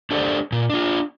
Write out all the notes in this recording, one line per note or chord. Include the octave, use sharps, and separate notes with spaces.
D4 G4 A4 C5 D5
A#2
D4 F4